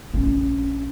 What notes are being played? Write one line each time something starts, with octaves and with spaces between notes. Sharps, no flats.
A#1 C#4